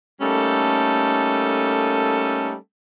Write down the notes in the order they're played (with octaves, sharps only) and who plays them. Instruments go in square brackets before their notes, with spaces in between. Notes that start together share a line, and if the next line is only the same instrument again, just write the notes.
[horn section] G3 A3 A#3 C#4 D#4 A4